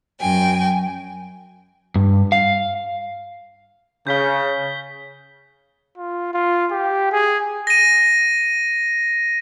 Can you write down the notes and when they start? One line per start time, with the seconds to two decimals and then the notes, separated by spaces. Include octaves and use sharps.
0.20 F#2 G5 G#5
1.95 G2
2.32 F5
4.07 C#3 G6 B6 G7
5.97 F4
6.34 F4
6.71 G4
7.12 G#4
7.67 A#6 D#7